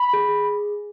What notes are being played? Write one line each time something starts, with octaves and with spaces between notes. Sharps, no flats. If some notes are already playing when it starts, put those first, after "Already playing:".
Already playing: B5
G#4